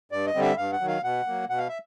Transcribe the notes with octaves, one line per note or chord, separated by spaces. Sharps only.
G2 D5
D#5
D3 G3 C4
E5
G2 F5
F#5
D#3 F#3
F5
B2 F#5
F#3 A#3
B2 F#5
F5
E5